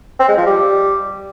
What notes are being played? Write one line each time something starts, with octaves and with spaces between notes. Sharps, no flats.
C4
G#3
F3
G3